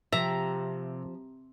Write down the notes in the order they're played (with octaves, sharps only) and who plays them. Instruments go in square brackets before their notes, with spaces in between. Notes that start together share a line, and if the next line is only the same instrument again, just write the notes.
[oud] C3 [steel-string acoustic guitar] F3 [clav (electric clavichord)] E5 [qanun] A#5